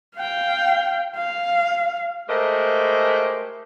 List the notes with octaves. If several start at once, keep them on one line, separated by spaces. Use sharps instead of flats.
F5 G5
F5
G#3 A3 G4 A#4 C5 D#5